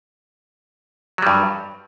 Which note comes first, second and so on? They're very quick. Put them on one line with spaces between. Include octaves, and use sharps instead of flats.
F#3 G3 G2